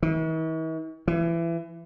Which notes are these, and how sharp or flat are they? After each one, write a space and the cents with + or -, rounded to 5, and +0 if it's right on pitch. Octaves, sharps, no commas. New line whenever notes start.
E3 -45
E3 +25